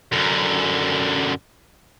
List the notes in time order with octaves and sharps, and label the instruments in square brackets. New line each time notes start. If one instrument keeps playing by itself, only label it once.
[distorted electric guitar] F#2 D3